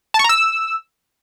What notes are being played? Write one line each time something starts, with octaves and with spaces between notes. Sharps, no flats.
A5
C#6
A#5
E6